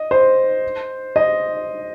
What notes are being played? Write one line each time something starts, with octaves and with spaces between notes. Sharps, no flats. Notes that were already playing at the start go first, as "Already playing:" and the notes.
Already playing: D#5
C5
D#5